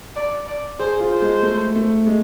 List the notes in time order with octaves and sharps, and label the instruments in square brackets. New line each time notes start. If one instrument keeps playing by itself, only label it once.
[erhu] D5
D5
[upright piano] G#4 [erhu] C5
[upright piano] F4
[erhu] C5
[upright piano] G#3
A3
A3
G#3